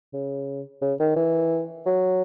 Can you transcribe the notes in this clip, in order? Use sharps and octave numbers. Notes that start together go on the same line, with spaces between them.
C#3
C#3
D#3
E3
F#3